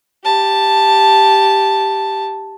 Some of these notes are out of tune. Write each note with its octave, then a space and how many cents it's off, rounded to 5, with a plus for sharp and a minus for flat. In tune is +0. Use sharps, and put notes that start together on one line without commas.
G4 +0 A5 +0